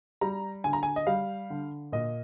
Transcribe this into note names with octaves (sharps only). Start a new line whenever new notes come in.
G3 A#5
D3 G#5
A#5
G#5
D#5
G3 F5
D3
A#2 D#5